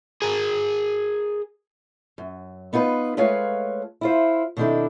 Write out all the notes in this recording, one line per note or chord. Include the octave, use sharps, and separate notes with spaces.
G#4 A#4
F#2
B3 D#4 F4 A4 B4
G#3 A3 F4 B4 C#5 F5
E4 F4 C5
B2 D#3 C4 D4 E4 A4